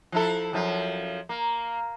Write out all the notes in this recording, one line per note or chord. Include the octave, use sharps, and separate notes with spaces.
F3 E4 A4
F#2 F3
A#3